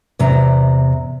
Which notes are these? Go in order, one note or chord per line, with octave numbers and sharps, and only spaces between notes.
E2 C3 A#5